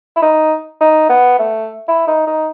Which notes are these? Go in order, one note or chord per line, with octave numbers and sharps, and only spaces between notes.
E4
D#4
D#4
B3
A3
E4
D#4
D#4